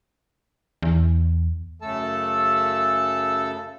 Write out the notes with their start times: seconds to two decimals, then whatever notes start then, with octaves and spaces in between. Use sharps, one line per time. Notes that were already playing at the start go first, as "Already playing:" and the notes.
0.82 E2
1.82 F#2 C#3 A3 A4 A5 E6